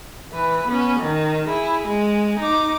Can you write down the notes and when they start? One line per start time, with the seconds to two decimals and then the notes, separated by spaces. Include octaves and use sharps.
0.32 E3 B4
0.67 B3 C#4
1.00 D#3
1.46 E4 G#4
1.88 G#3
2.40 D#4 D6